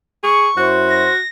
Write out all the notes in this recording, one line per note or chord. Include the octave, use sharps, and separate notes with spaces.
G#4 C#6
F#2 E4 F#4 C5
A#6